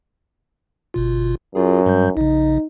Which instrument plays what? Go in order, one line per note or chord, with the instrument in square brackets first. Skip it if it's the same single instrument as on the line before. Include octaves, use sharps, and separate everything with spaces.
[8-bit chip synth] G1 B2 F4
[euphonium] F#2 [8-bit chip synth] F4 G#4
[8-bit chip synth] G2 G3 G6
[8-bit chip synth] A#1 C#3 [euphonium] D#4